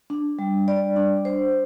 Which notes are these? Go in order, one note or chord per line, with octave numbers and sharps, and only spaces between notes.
D4
G3
D5
D4
C5